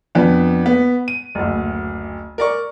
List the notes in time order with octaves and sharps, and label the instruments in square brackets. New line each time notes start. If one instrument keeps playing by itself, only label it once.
[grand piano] F2 B3 D4
B3
D#7
F#1 D2
A#4 D5 C#6